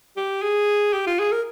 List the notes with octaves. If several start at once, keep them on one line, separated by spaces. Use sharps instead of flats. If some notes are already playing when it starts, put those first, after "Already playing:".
G4
G#4
G4
F4
G#4
A#4